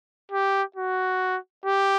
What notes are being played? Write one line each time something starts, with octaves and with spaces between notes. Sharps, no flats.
G4
F#4
G4